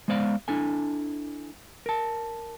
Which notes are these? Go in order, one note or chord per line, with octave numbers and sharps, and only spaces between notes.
G#3 B3 C5 D5 F5
D4 E4 A4 G#5
A#4 A5